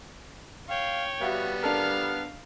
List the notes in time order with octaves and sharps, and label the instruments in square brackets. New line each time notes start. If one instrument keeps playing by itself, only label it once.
[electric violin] C#5 [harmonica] F5 [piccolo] G5
[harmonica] G3 B3 [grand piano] F#4 E5 F5
[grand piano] D4 A4 A#4 [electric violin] F5 [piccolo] F6